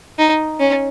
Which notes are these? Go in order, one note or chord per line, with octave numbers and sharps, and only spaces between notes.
D#4
C#4